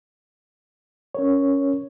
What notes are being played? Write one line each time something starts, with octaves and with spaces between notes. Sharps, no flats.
C#4 A#4 C#5